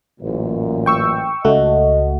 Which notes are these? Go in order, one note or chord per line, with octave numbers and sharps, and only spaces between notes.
A1 F#2 A#2
G5 C#6 E6
C#2 A3 F#4 D#5